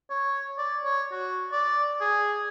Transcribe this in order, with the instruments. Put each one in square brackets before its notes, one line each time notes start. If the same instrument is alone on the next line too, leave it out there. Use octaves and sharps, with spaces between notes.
[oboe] C#5
D5
C#5
F#4
D5
G#4